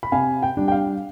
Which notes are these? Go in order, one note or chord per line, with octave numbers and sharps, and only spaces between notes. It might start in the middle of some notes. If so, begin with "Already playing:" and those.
B5
C3 F5 G#5
G5
G3 D4
G5
F5